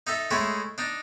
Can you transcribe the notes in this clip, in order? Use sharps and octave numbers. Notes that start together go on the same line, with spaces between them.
D#4 A4 E5
G#3 A3 E4 G#4 C#5
D4 D#4